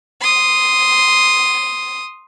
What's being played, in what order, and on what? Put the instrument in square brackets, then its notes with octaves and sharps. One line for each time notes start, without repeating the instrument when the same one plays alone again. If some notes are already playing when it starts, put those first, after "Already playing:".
[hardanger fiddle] C6 D#6